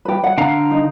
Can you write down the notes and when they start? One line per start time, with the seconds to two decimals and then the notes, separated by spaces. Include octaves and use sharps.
0.05 G4 B4
0.24 F#5
0.38 D3 F5 A#5
0.71 D#4